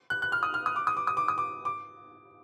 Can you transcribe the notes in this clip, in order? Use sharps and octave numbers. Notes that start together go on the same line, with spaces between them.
F#6
F#6
F6
D#6
F6
D#6
D6
D#6
D6
D#6
D6
D#6
D6
D6